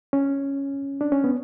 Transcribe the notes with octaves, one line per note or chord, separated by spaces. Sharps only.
C#4
D4
C#4
B3